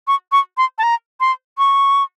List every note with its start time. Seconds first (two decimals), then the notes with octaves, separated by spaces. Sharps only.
0.07 C#6
0.32 C#6
0.57 C6
0.78 A5
0.83 A#5
1.20 C6
1.58 C#6